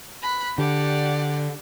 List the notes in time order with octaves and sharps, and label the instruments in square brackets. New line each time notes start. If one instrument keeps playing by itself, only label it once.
[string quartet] B5 F#6
[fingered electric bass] D3 [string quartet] G4 D5 F#5